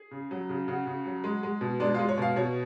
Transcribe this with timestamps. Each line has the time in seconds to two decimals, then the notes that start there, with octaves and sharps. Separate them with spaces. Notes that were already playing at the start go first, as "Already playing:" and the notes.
Already playing: G#4
0.11 C#3
0.31 F#3
0.49 C#3
0.68 C#3 F#4
0.86 C#3
1.06 F#3
1.24 G#3
1.43 G#3
1.61 B2
1.80 G#3 D4
1.94 G#3 F4
2.09 C#5
2.18 B2 F5
2.36 B2 C#5